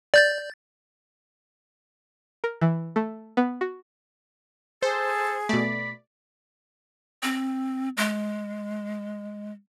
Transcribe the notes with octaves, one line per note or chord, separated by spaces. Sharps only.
D5 G6 A6
A#4
E3
A3
B3
F#4
G#4 A4 C5
B2 A3 D5 B5
C4
G#3